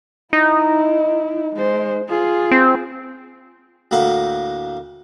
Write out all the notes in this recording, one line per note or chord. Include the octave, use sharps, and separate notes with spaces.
D#4 E4
G#3 C5
F4 G#4
C4
D2 A2 A#3 A#4 F#5